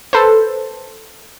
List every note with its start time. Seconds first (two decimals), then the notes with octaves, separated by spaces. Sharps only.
0.13 A4 B4 C5